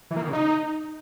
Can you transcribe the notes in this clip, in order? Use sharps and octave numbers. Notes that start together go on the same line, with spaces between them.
E3
A#3
D#3
C#3
D#4